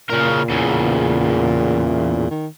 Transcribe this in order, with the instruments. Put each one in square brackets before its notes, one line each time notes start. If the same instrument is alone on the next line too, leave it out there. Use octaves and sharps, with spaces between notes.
[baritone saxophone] A#2 [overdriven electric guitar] C#3 A#4
[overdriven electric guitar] E2 C#3
[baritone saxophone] D#3